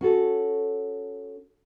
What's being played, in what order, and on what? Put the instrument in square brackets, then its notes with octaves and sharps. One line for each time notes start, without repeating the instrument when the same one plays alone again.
[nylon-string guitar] C#4 F#4 A4